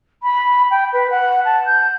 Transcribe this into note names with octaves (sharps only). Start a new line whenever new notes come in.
B5
G5
B4
F#5
A5
G6